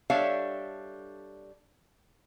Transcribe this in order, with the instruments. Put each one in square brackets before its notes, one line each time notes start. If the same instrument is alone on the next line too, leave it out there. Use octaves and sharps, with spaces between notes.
[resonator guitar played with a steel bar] G3 D4 A4 C#5 E5 F5